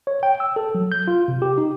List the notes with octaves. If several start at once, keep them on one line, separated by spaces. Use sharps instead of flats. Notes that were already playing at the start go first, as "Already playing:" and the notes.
C#5
G5
E6
A4
F#3
G6
F4
C3
G4
D#4